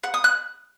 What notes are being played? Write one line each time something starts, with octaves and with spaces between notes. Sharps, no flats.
F#5
D#6
F#6